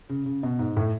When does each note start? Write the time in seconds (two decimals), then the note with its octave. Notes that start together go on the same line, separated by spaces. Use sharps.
0.09 C#3
0.26 C#3
0.43 B2
0.59 G#2
0.77 A2